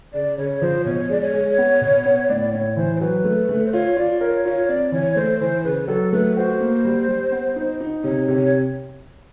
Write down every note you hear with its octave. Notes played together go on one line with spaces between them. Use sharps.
C#3 D5
C#3 C#5
F3 C5
B2 C#5
G#3 D5
C#5
G#3
B3
B2
B3
A2 D5
D5
A2 C#5
E3 C5
C5
F#3 B4
A3
A3
C5
F4 C#5
F4 D5
A#4 C#5
F4 C#5
C4 D5
E3 C#5
A3 C5
E3 C5
C#3 B4
F#3 A4
A3 B4
F#4 C5
A#3
G3
G3
B3
D#4
D#4
C3 C#5
C3 C#5